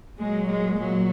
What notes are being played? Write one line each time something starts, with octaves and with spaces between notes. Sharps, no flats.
A#2 F#3 G#3
G#3
F#3